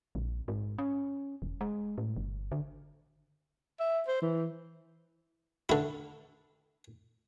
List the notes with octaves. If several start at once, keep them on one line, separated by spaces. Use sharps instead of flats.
A#1
G#2
C#4
E1
G#3
A2
G1
D3
E5
C5
E3
D3 E4